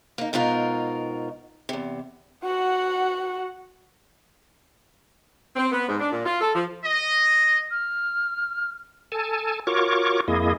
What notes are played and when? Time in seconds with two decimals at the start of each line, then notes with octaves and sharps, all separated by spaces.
0.18 A#3 D#4
0.33 G#2 B2 D#4 F4 A#4
1.69 E2 C3
2.44 F#4 F#5
5.56 C4
5.72 B3
5.88 G#2
6.00 D4
6.12 A#2
6.25 F4
6.41 A4
6.55 F3
6.84 D#5
7.71 F6
9.12 A4 G#5 A5
9.67 F4 F#4 A#4 C#5 C#6 D6
10.28 F2 A#3 E4 G#4 D#5